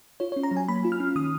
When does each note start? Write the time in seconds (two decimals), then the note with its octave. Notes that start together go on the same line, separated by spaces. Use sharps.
0.20 F4 C#5
0.32 C#5
0.36 C#4
0.43 A#5
0.51 F#3
0.57 G#5
0.68 A#3 B5
0.84 F4
0.92 F6
1.00 C#4
1.16 D#3 D#6